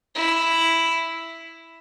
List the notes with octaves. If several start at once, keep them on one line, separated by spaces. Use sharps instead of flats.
E4